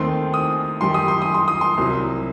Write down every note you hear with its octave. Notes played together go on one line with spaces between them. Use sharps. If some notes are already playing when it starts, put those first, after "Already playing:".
Already playing: D#2 D#3 A3 C4 C6
D#6
F#2 D#3 G3 C6
D#6
C6
D#6
C6
D#6
C6
C2 C3 F#3